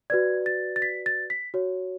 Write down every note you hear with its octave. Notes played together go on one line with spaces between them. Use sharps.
F#4 B4 D5 G#6
A6
A6
B6
A6
B6
F#4 C#5